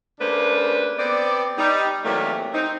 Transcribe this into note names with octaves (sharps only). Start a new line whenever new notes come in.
C#3 A3 A#3 D4 B4 C5
B3 C4 G4 D5
G3 D#4
C3 E3 F#3 G3 A3 A#3
C4 D#4